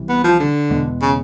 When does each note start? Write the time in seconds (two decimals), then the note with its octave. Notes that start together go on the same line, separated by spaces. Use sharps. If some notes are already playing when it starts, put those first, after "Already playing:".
Already playing: C2 C3 E3 G3
0.09 B3
0.24 F3
0.40 D3
0.70 E2 B2 G#3 B3
1.02 C#3